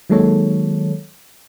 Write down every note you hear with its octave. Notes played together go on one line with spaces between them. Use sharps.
D#3 F#3 G#3 A#3 A4 C#5